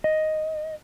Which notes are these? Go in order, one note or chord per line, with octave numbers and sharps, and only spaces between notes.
D#5